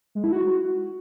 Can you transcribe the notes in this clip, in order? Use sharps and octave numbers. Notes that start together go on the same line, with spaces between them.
G#3
E4
F#4